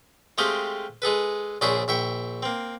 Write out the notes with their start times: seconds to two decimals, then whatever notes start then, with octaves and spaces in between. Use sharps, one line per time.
0.38 G#3 A3 C4 G4 D#5 F5
1.02 G#3 G#4 A4 B4
1.61 A#1 C#3 D4 G#4 C5 E5
1.88 A#1 E5 G5 C#6
2.43 A#3 C4